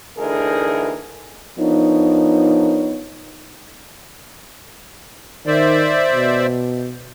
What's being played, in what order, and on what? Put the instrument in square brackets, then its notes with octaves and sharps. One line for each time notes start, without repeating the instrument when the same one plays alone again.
[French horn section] D2 D3 E3 D#4 G#4 A#4
F3 B3 D4 D#4 A#4 C#5
[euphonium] D#3 [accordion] C5 D5 E5
[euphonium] B2